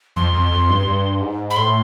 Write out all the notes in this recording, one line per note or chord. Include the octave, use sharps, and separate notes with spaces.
F2 C6
F2
F2
G2
G2
G#2
B5
A2 C6